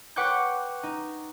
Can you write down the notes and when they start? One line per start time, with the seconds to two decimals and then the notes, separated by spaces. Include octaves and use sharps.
0.16 B4 F#5 G5 C#6 D6 G6
0.83 D#4